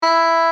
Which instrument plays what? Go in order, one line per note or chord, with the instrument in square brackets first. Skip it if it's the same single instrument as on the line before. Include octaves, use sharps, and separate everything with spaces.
[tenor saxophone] E4